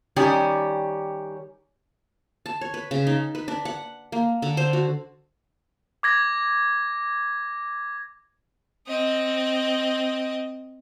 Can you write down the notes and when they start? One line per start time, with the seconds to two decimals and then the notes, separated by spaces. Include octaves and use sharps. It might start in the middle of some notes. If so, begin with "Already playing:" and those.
0.16 D#3 G3 C#4 G4
2.46 A5
2.61 C#5
2.74 B4
2.91 C#3
3.07 D#4
3.35 B4
3.48 D4
3.65 F#5
4.12 A#3
4.42 D3
4.57 C5
4.73 F#4
6.03 D6 G#6 A#6
8.87 C4 D#5